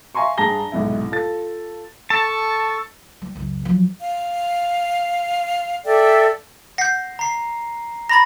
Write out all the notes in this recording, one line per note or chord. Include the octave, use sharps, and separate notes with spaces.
E5 F5 G#5 A#5 C6 C#6
G2 G#4 A5 A#5 A#6 G7
B1 G#2 C3 E4
F4 A4 A6
A4 A5 C#6
G3
C#2 F#2
F3 F#3
F5
A4 D5 E5 G5
F#5 G6 A#6 C7
A#5 C7
A#5 B5 A6 A#6